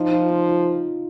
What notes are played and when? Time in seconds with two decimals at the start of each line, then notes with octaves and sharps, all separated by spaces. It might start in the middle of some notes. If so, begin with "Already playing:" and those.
Already playing: F3 D#4
0.13 F4
0.31 D#4
0.49 F4